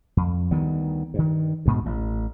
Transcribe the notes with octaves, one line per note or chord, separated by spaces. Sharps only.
F2
D2 D#3 G3 B3
G2 D#3
D2 G#2 B2
A1